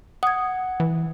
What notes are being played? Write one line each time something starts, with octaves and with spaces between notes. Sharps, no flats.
F#5 D#6 G#6
E3